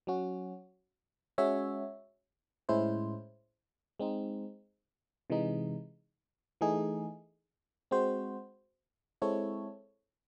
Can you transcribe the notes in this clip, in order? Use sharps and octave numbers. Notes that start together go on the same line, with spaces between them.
F#3 C#4 F#4
G#3 C#4 F#4 C#5 E5
A2 G#3 C#4 E4 C5
G#3 C4 D#4
C3 E3 G#3 D#4
E3 A3 D#4 G#4
G#3 C4 F#4 C5
G#3 C4 E4 A4 C#5